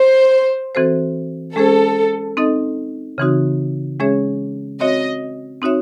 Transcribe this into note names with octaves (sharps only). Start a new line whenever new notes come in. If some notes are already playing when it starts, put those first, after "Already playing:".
Already playing: C5
E3 C4 F#4 A4 C5
G#3 C#4 G#4 A4 C5
C4 D#4 A4 D#5
C#3 E3 C4 D#4 F#4
G#3 C#4 G#4 C#5 E5
C4 F#4 C#5 D#5 E5
C4 D#4 F#4 C#5 E5